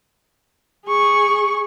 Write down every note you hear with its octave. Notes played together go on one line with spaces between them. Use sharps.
G#4 C#6